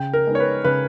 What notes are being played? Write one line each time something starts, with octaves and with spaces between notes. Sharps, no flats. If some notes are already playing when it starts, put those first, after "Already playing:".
Already playing: C#3 G5
A#4
G#3 B3 D#4
C#5
B4
C#3 B4